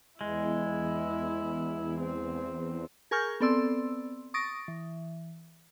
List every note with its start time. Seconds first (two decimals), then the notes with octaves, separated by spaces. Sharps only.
0.21 E2 G#3 E4
2.00 C4
3.11 G#4 A#4 G#5 C#6 F6 G6
3.40 B3 C4 A4 D5 C6 E6
4.34 C#6 D#6 A6 A#6 D7
4.68 E3